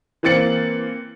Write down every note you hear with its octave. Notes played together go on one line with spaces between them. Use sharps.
E3 A#3 C4 A6 C#7 F#7